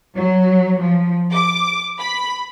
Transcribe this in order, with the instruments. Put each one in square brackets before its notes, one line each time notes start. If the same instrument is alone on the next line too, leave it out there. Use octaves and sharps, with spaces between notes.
[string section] F#3
F3
D6
B5